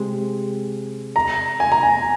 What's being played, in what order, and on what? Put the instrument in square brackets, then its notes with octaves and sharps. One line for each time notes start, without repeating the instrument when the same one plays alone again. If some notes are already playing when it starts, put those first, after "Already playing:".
Already playing: [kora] C3 G#3
[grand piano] A#5
G#5
A#5
G#5